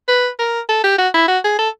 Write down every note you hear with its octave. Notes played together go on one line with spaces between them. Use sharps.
B4
A#4
A4
G4
F#4
E4
F#4
G#4
A4